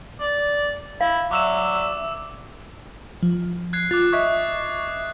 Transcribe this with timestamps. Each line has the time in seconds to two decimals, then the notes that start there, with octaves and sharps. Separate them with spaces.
0.20 D5
1.01 E4 F5
1.31 F#3 D5 E5 D6 E6 E7
3.23 F3
3.73 F#6 G#6 C7
3.91 F4 D6 F#6 A6
4.12 D#5 E5 C#6 D#6 G#6 B6